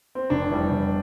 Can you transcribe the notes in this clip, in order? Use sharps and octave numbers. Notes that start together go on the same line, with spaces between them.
C4
F1 D4
E2 E3 G3
F1